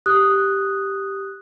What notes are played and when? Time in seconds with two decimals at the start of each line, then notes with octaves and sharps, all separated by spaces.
0.06 G4 D#6 F#6